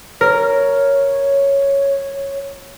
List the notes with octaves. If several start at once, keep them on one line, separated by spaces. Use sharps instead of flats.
A#4 C#5